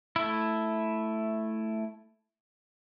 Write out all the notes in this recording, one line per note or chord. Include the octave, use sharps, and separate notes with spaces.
A3 E4